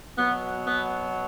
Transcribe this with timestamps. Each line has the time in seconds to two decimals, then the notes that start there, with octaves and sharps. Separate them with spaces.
0.17 B2 F#3 B3
0.65 B3